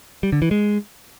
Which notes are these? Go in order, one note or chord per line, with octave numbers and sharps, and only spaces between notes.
G3
D3
E3
G#3